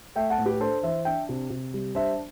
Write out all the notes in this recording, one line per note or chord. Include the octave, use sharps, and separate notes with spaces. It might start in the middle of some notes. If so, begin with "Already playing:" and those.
A3 E5 G5
F#5 A5
A2
G4 B4
D4 A4 C5
E3 C5 E5
D4 E5 G5
C3
C3
G3
D4 C5 E5